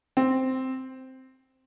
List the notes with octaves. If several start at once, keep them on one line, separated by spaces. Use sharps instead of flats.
C4